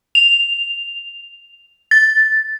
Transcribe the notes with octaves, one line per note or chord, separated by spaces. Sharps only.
F7
A6